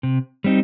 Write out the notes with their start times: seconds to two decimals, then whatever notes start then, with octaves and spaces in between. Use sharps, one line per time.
0.03 C3
0.44 G3 C4 D#4